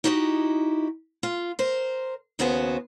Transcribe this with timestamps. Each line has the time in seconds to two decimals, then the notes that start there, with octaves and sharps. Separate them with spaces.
0.04 D#4 E4 F#4 G4 D5 D#5
1.23 F4
1.59 A#4 C5
2.39 D#2 C#3 B3 F#4 C5